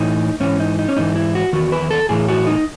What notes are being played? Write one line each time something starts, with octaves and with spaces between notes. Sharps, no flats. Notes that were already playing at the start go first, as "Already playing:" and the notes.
Already playing: A2 E3 D#4
G#2 E3 C#4
D#4
D#4
C#4
G#2 E3 D#4
E4
F#4
E2 D#3 F#4
B4
A4
A2 E3 G#4
F#4
D#4